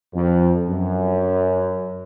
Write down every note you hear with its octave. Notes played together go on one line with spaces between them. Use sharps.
F2
F#2